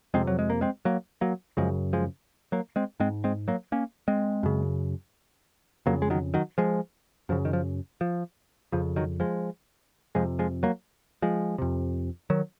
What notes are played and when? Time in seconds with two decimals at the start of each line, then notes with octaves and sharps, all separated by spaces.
0.14 F2 C3 G#3 C4
0.27 F#3
0.39 G#3
0.50 A#3
0.61 G#3 C4
0.85 F#3 A#3
1.21 F#3 A#3
1.57 F#2 C#3 F3 G#3
1.93 F3 G#3
2.52 F#3 A#3
2.76 G#3 C4
3.00 G#2 G#3 C4
3.24 G#3 C4
3.48 F#3 A#3
3.72 A#3 C#4
4.08 G#3 C4
4.43 F#2 C#3
5.86 F2 C#3 F#3 A#3
6.02 G#3
6.10 D#3 F#3
6.34 D#3 F#3
6.58 F3 G#3
7.29 F#2 C#3 F3
7.45 D#3
7.53 F3
8.01 F3
8.72 F2 C#3 F3
8.96 D#3 F#3
9.20 F3 G#3
10.15 F2 C3 F3 G#3
10.39 F3 G#3
10.63 F#3 A#3
11.22 F3 G#3
11.58 F2 C3
12.30 D#3 F#3